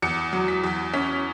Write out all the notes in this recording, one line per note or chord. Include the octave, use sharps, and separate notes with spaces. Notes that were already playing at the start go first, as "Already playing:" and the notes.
E2 C#7
F#3
B6
E2
C#4 B6